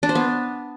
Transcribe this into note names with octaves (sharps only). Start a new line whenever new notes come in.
D4
C5
B3